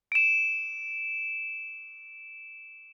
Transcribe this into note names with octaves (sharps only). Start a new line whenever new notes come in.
D7 E7